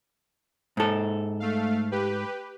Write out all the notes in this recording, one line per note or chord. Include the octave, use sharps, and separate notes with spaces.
G#2 A4
A3 F5
G4 B4